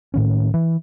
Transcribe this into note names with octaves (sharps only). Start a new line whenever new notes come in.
A2 D#3 C#4
E3